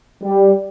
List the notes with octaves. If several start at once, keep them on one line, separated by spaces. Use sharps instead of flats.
G3